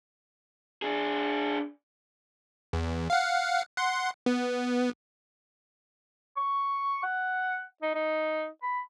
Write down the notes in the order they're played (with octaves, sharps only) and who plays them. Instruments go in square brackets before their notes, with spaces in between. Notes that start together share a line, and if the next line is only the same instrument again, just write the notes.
[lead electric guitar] D4 G#4
[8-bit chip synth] E2
F5 F#5
F#5 C6
B3
[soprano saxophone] C#6
F#5
D#4
D#4
B5